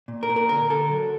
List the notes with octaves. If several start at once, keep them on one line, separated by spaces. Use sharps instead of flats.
A#2
A#4
A#2
A#4
D3 A#4
D3 A4
F#3